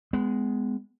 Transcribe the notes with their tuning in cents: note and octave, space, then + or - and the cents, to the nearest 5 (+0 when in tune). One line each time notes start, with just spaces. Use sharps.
G#3 +0 B3 +25